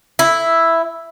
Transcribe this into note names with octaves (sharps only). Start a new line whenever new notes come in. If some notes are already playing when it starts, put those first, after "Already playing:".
E4